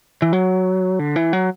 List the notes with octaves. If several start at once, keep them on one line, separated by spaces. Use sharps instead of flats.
E3
F#3
D3
E3
F#3